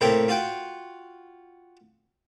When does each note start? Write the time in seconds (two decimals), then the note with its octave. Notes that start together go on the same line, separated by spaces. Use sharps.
0.01 A2 C3 A#3 C4 A#4 G5
0.28 F4 F#4 F5 G5